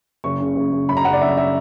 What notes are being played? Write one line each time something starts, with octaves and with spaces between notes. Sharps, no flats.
F#1 C#6
C#3
F#1
F#1
F#2 B5
A#5
F#1 F#5
D5
F#2 E5
E5